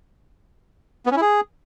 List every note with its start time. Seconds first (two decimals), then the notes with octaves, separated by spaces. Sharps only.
1.06 B3
1.11 C#4
1.16 E4
1.22 G#4